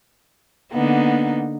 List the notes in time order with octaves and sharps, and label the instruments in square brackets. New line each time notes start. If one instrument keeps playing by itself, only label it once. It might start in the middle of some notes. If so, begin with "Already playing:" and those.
[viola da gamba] D3 A#3 D#4 [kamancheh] B3